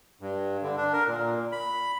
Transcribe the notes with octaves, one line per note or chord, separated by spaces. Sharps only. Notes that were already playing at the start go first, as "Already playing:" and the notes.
G2
D3
D4
A#4
A#2
B5